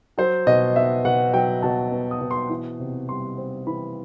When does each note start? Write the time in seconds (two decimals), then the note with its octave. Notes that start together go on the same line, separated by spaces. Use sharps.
0.18 F#3 C5
0.47 B2 D#5
0.76 B3 E5
1.05 B2 F#5
1.33 F#3 G5
1.63 B2 A5
1.92 B3
2.11 D#6
2.21 B2
2.31 C6
2.50 E3
2.79 C3
3.08 G3 C6
3.37 C4
3.67 E3 B5